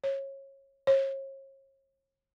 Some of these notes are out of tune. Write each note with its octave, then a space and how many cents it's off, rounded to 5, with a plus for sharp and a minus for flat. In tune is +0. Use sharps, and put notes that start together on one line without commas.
C#5 -25
C#5 -40